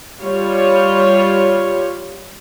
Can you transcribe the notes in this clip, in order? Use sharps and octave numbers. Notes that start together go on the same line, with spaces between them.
G3 F4 C#5